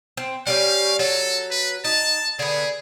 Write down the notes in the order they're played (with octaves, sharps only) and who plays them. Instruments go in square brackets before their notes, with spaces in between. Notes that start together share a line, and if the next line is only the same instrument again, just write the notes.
[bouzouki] C4
[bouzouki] G3 C4 C#4 [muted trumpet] F5
[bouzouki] F#3 [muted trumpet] A4
[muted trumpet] B4
[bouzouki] D#4 [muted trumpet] A5
[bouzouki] D3 B3 [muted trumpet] G#4